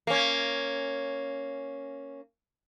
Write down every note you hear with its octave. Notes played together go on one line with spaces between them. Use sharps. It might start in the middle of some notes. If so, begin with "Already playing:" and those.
A#3 C#4